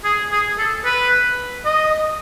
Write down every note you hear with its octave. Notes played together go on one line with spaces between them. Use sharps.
G#4
G#4
A4
B4
D#5